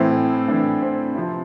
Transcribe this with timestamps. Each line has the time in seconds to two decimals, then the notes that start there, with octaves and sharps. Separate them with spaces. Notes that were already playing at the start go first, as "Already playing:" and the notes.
Already playing: A2 E3 C4 E4
0.48 A2 E3 D4
0.82 C4
1.16 C3 F3